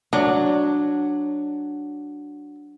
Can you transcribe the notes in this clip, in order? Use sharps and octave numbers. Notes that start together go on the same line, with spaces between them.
F#3 D4